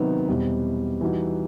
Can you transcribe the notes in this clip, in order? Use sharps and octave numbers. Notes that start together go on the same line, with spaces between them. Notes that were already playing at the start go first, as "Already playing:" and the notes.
Already playing: C3 D#3 F#3 B3 D#4
E2 B2 G3 C4
E3 G3 D#4 F#4